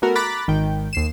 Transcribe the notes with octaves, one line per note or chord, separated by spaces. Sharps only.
A3 B3 F#4 A#4
A#5 B5 D6 F#6 A6 B6
G#1 D#3 G5
D#2 C7 E7